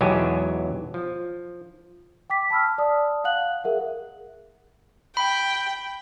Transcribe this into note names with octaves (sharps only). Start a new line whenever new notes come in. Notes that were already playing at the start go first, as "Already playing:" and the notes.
B1 E2 F#3 G#3 G4 G#5
F3
G5 D6 B6
A5 B5 E6 F6
D5 A5 D#6
F5 F#5 F#6 F#7
G#4 A#4 E5 F#5
G5 B5